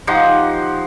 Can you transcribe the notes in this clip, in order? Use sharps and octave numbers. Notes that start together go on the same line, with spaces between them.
F3 D#4 G4 F#5